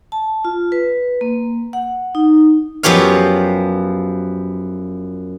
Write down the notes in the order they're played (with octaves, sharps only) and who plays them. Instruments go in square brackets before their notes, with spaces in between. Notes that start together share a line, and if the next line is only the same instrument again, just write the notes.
[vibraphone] A5
F4
B4
A#3
F#5
D#4
[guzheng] F#2 F3 B3 G4 C#5 F5